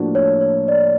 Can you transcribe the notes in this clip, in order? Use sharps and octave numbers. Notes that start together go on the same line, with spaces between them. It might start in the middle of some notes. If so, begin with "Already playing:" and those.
Already playing: A2 F3 A#3 D4 F#4
C#5
C#5
D5